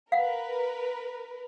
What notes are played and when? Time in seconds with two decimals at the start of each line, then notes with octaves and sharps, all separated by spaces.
0.12 A#4 B4 F5 F#5